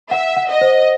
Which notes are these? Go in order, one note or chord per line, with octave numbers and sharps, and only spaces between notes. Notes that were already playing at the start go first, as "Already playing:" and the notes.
E5 F#5
F#5
D#5
C5